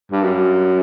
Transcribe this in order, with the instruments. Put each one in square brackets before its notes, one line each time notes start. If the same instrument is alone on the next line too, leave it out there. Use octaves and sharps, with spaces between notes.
[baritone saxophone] G2
F#2